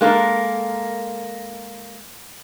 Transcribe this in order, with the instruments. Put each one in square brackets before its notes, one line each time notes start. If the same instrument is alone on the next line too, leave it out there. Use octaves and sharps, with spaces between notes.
[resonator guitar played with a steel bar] G#3 A#3 A4 A#4